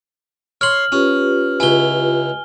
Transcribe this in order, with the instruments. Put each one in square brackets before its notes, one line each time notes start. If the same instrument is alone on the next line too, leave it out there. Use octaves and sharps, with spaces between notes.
[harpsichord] C#5 C6 [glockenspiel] F6 F#7
[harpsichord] C#4 [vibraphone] F4 G4 B4
[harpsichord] C#2 E4 [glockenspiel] G#5 G7